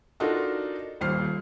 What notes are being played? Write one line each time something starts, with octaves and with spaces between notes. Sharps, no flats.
D4 D#4 F4 F#4 A4 A#4
D#1 D#2 C5 F6 C7